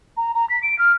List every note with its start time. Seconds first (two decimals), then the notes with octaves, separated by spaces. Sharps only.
0.17 A#5
0.34 A#5
0.49 B6
0.63 D7
0.78 F6